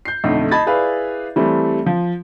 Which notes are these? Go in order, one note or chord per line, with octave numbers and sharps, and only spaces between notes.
G6 C7
B1 F2 D3 A3
D#5 A5 B5 G#6 A6
E4 G#4 B4 D5 F5
E3 G3 A3 C4
F3